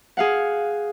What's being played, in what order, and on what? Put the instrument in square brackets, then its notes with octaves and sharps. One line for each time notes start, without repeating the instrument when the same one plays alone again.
[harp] G#4 F5 F#5